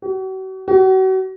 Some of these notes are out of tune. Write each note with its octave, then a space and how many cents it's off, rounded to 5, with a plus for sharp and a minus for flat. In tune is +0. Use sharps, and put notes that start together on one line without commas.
F#4 +40
F#4 +35